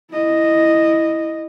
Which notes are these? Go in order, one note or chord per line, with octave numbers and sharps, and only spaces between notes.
E4 D#5